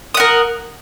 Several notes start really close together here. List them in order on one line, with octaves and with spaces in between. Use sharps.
D#6 F#5 A#4